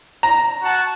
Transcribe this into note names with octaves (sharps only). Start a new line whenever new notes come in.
A#5
F#4 A5